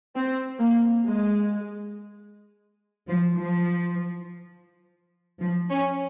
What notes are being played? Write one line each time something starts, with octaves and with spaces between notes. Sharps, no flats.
C4
A#3
G#3
F3
F3
F3
C#4